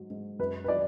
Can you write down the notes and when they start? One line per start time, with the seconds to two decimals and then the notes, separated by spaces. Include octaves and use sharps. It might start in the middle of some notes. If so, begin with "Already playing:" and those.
Already playing: G#2 F#3
0.10 G#2
0.39 F#2 B4
0.64 B4
0.68 F#3 D5